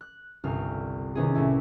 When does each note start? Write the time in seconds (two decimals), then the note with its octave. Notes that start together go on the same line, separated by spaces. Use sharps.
0.01 F#6
0.44 G1 C2 F6
1.15 C3 D#3 B3 C#4 E4 G#4
1.35 C2 A2 A3 E4